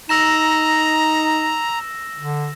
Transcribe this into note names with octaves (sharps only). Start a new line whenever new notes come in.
D#4 A#5 E6 A#6 E7
D3